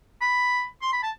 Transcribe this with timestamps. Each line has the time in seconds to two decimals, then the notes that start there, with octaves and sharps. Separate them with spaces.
0.21 B5
0.82 C6
0.93 B5
1.03 A5